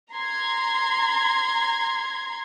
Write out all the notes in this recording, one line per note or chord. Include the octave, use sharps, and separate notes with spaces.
A#5 C6 G#6